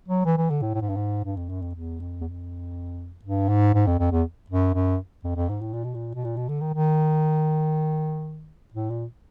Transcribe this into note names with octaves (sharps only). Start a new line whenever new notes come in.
F#3
E3
E3
D3
A2
A2
G#2
G2
G#2
G2
F2
F#2
F2
E2
F2
E2
F2
G2
G#2
G#2
F2
F2
E2
F#2
F#2
F2
F2
G#2
A2
A#2
B2
A#2
B2
A#2
B2
D3
D#3
D#3
A2
A#2